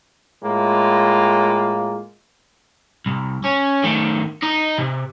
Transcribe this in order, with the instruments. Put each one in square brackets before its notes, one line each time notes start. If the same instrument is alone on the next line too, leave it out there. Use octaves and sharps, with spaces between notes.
[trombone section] A2 G#3 A#3 F4
[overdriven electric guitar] C2
C#4
D#3 A3
D#4 D#5
C3